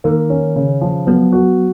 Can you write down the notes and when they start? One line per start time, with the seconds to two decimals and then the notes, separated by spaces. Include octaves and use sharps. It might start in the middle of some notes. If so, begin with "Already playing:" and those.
0.04 D#3 A#3
0.30 C#4
0.56 C#3
0.81 F3
1.07 F#3 B3
1.32 F#4